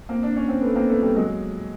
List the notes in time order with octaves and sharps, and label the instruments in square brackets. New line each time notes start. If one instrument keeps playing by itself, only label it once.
[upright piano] A#3 C4
D4
C#4
C4
A3 B3
A#3 C4
A3 B3
G3 A3
F#3 G#3